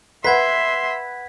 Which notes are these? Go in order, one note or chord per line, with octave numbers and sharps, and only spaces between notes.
B4 E5 F#5 C6 G#6 B6